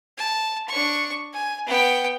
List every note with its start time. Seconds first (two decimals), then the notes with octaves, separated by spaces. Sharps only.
0.18 A5
0.68 D4 C#6
1.33 G#5
1.67 B3 G5